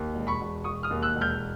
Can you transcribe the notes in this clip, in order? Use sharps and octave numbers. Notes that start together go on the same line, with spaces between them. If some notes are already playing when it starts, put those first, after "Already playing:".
Already playing: D#2
E1
B5 C#6
E1
E1 C#6 D#6
D#6 F6
D#2
E6 F#6
E1
F6 G6